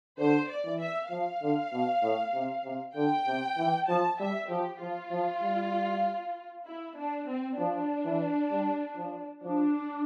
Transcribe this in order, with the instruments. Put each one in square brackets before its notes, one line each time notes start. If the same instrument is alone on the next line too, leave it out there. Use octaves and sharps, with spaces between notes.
[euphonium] D3 [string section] C5
[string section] D5
[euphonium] E3
[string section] E5
[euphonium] F3 [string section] F5
[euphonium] D3
B2
A2
C3
C3
[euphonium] D3 [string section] G5
[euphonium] C3
E3
[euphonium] F3 [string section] A5
[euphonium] G3 [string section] E5
[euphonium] F3 [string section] G4
[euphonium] F3 [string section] F4
[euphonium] F3
G3
[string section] E4
D4
C4
[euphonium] F3 [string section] D4
[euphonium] E3
G3
F3
[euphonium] F3 [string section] D4